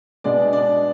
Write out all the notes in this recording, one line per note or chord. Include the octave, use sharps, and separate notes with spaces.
B2 G#3 B3 D4 D5
D4 D5